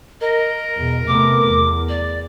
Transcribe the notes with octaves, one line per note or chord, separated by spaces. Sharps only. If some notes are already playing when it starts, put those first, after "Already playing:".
A#4 D#5
E2 B2
C3 A3 B3 D6
E2
D5